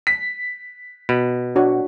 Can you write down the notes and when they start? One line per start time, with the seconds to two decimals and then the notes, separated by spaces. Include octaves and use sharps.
0.07 B6
1.09 B2 B5
1.56 D4 F#4 C#5